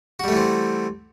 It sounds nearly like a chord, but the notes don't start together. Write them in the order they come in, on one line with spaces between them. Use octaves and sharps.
F#4 G3 A3 E3 C4